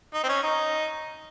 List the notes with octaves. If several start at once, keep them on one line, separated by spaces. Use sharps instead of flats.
D#4
C4
C#4
D#4